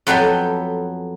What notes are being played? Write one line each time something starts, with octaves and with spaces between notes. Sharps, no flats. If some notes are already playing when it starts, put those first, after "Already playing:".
F2 F#3 B3 A4 G5